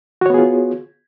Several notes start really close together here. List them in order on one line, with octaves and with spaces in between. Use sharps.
F#4 C#5 B3 G#4 F4